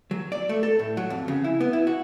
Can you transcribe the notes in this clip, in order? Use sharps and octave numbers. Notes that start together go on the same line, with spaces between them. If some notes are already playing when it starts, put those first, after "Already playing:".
F#3
D5
A3
A4
A2
F#3
F2
C#3
E4
B3
E4
F#4